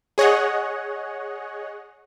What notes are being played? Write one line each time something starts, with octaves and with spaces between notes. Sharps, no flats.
G#4 C#5 D#5 F#5